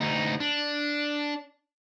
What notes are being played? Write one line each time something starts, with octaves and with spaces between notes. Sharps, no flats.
D2 D#4
D4